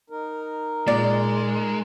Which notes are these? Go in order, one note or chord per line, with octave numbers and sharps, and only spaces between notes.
D#4 A#4
A#2 G#3 D5